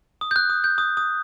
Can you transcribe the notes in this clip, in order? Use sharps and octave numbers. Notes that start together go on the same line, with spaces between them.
D#6
G6
F#6
D#6
G6
D#6
D#6